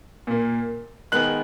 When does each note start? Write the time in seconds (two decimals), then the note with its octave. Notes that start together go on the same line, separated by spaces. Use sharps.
0.27 A#2 A#3
1.12 D#3 G#3 B3 F#6 F#7